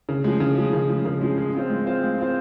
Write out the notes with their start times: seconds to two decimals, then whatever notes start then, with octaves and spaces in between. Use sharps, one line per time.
0.09 C#3
0.24 F3 G#3
0.40 C#3
0.58 F3 G#3
0.73 C#3
0.90 F3 G#3
1.05 C#3
1.21 F3 G#3
1.38 G#3
1.54 C4 F4 C5
1.70 G#3
1.86 C4 F4 C5
2.03 G#3
2.18 C4 F4 C5